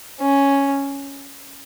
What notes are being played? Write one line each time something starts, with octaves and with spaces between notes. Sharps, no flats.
C#4